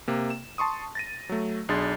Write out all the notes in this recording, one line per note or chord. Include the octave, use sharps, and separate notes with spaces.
C3 A#3
E7
A5 C6 C#6 D#6
A6 A#6 D#7
F#3 A3
B1 D4 G#4 C6 A6